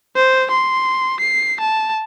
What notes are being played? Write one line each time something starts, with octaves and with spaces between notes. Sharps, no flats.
C5
C6
C7
A5